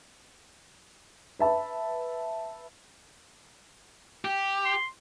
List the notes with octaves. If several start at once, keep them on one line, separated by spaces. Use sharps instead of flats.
B4 E5 A5 B5
G4
C6